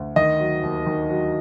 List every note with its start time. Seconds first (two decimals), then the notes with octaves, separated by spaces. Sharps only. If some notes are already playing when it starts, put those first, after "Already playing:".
Already playing: D2
0.16 D#3 D#5
0.40 F#3
0.63 D#2
0.86 D#3
1.09 F#3